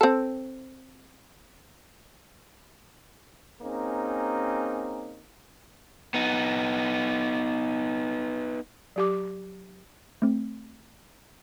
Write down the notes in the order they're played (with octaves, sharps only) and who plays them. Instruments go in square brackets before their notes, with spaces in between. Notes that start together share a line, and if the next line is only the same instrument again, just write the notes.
[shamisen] C4 A4
[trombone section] A#3 C4 C#4 D#4 G#4
[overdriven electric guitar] B3 D#4
[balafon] F#3 G4 D6
[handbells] A3 C4